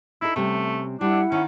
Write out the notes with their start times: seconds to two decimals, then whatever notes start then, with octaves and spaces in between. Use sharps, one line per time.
0.22 D#4 E4 A4
0.36 C3 G3 A3 C#4
1.01 G3 D4 E4 F#5
1.32 D#3 C#4